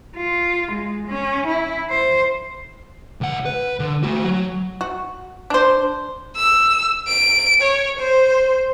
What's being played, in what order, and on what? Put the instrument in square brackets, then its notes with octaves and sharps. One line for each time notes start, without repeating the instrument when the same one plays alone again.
[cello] F4
G#3
C#4
E4
C5
[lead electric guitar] C#2 F#5
B4
D3
A3 F#4
F#3
[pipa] F#4
D4 C5
[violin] E6
D7
C#5
C5